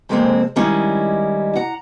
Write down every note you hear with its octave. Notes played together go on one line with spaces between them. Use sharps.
F2 G#2 C3 G#3 A#3 C4
D#3 G3 G#3 C#4 E4 D#5
F#5 A#5